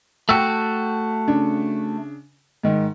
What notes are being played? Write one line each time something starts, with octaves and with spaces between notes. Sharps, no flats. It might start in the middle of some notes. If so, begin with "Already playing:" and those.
A3 F#4 G5 A5 E6
C#3 D4
G#2 D#3